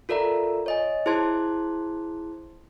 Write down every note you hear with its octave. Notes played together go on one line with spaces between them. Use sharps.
F4 A4 A#4 D5 E5 A#5
C#5 D#5 G#5
E4 G#4 C5 A5 C6 G#6